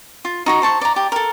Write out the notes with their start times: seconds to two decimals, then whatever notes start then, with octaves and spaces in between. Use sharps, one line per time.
0.25 F4
0.46 D#4 F#4 A#5
0.62 C5 A5 C#6
0.81 D5 A#5
0.96 G4 A5
1.12 A4 A#4